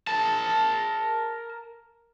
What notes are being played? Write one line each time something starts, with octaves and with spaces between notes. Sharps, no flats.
A#4 A5